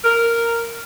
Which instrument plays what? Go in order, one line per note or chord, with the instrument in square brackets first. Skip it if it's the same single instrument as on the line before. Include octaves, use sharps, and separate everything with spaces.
[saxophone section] A#4